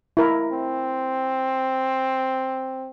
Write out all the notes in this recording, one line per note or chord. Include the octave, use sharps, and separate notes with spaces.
E4 A#4
C4